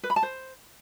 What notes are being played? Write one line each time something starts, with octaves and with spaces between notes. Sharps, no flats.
B4
B5
A5
C5